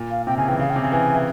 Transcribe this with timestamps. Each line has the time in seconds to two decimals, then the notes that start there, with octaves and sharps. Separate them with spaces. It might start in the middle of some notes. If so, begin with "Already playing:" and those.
Already playing: A#2
0.10 F5
0.27 C3 G5
0.37 C#3 G#5
0.48 E3 G5
0.59 C#3 F5
0.70 G5
0.76 C3
0.81 G#5
0.84 C#3
0.92 E3 G#5
1.15 E3